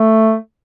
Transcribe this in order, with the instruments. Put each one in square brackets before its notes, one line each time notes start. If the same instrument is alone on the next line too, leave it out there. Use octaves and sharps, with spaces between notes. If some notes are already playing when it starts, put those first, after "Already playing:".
Already playing: [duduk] A3